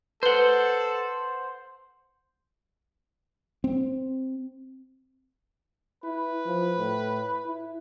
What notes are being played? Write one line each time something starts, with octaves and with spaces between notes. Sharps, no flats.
A4 B4 C5 F#5 G7
C4
E4 B4
F3
A2
E4